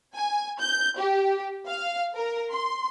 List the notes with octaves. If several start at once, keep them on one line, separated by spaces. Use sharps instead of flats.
G#5
G6
G4
F5
A#4
C6